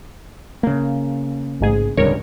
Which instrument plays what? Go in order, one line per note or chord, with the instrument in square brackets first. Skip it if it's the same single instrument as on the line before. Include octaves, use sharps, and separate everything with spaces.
[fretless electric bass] C#3 A#3
[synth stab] A1 G#2 G#4
[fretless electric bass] D1 C#2 G2 [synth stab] A#4 C#5